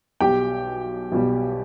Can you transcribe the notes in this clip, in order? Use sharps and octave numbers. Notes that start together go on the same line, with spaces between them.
B1 B2 G3 G4 G5
B1 B2 G3